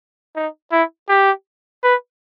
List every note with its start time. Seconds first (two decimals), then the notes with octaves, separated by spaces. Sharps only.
0.36 D#4
0.72 E4
1.09 G4
1.83 B4